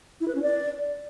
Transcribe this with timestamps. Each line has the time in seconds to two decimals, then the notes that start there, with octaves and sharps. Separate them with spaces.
0.20 E4
0.28 B4
0.35 C#4
0.42 D5